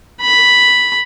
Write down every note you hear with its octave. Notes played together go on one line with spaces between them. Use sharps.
B5